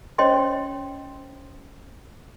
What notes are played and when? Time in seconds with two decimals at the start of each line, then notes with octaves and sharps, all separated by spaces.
0.18 C#4 C5 C#5 D#5 G5 C6